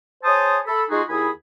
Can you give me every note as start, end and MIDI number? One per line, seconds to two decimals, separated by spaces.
0.24 0.58 68
0.24 0.58 72
0.24 0.58 73
0.24 0.58 81
0.24 0.58 87
0.66 0.83 69
0.66 0.83 83
0.90 1.01 56
0.90 1.01 63
0.90 1.01 65
0.90 1.01 66
0.90 1.01 68
1.09 1.29 39
1.09 1.29 64
1.09 1.29 68
1.09 1.29 80
1.09 1.29 83
1.09 1.29 87